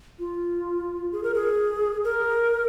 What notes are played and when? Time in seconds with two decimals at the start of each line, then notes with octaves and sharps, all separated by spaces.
0.19 F4
1.12 G#4
1.23 A#4
1.34 G#4
2.04 A#4